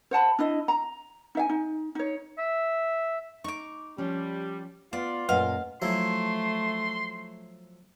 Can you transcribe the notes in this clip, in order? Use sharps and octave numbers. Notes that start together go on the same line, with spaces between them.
C5 F#5 A5 B5
D4 E4 D#5
A#5
D#4 E5 G#5
D#4
D#4 C#5
E5
D#4 C#6 D6
F3 G3 C#4
B3 F4 D5
F#2 A#2 G#3 B4 D#5 F5 F#5
F3 F#3 A3 E4 C6